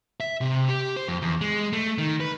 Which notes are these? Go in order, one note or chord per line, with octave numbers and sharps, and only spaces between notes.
E5
C3
G4
C5
F2
E2
G#3
A3
D#3
B4